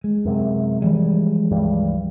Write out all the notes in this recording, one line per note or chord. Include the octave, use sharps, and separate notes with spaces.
G#3
F#2 C3
E3 F3 G3 G#3
C#2 G2 G3